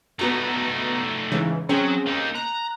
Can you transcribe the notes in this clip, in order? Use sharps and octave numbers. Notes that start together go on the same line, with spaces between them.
A3 B3 D#4 F#4 A#5
G#2 C#3 E3
F#3 C4 C#4 G#4
A#3 D#4
A#5 F#6